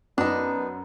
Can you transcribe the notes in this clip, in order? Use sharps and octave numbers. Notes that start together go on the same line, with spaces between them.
F#2 B3 D4 D#4